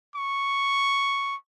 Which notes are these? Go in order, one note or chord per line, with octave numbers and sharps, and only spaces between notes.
C#6